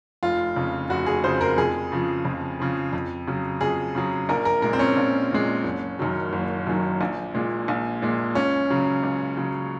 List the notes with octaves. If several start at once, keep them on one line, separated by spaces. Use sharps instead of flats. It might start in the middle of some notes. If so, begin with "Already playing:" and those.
F1 F4
F2 C#3
F1 F#4
G#4
F2 C#3 C5
A#4
F2 G#4
C#3 F3
F2
C#3 F3
F2
C#3 F#3
F2 G#4
C#3 F#3
A#1 A#4
A#4
A#2 G#3 A#4
C4
C#4
A#1
A#2 G#3
F#1
F#2 D#3 F#3
F#1
F#2 D#3 F#3
A#1
A#2 G#3
A#1
A#2 G#3
C#2 C#4
C#3 F#3
C#2
C#3 F#3